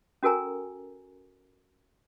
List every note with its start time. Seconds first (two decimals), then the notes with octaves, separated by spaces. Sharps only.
0.23 C#4 F#4 A4 A#4 G#5 A#5